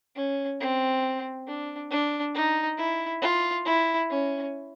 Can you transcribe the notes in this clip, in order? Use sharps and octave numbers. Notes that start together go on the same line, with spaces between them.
C#4
C4
D4
D4
D#4
E4
F4
E4
C#4